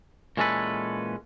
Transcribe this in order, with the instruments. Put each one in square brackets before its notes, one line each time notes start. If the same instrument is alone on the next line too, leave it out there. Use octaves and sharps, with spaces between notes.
[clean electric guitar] A#2 E3 G#3 C#4 A4 B4